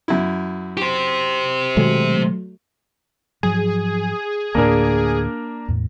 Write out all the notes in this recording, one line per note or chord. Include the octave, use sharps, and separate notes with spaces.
F#2 E4
G4 C5
B2 D#3 F#3 G#3 A3
G#2 F3 F#3 G#4
D2 A2 A#3 D4 A#4
E2 A2